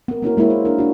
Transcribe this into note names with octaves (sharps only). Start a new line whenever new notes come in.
B3 A#4
A#3 B3 C#4 E4 F#4 A#4
G#3 A#3 B3 E4 A#4 C#5
C5
D4 A#4
D4 F#4